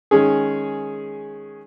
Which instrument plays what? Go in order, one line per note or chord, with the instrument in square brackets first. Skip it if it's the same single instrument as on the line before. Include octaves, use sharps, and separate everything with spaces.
[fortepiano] D#3 G#3 C#4 G#4